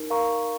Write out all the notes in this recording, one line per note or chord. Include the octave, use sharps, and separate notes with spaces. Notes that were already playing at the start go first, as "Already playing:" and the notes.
Already playing: D#4 A#4
A#4 F5 A#5 C#6